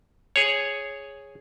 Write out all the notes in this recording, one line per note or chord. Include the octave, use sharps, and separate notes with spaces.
G#4 C#5